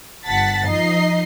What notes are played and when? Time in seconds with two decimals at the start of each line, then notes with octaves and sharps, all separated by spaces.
0.25 G1 F#5 A5 A6 B6
0.67 F3 D#4 D#5 C7